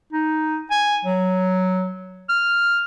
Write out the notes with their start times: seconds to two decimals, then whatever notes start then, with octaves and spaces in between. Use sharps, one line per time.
0.12 D#4
0.71 G#5
1.05 F#3
2.29 F6